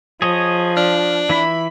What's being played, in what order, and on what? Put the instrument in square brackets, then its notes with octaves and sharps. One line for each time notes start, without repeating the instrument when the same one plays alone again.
[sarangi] F3 [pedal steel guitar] G#4 C#5 D#5
[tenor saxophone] D4 [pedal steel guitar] F6
[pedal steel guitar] E3 E4 E5 [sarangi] B5